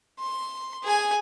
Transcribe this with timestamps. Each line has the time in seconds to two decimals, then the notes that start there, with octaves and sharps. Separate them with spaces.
0.19 C6
0.84 G#4 G#5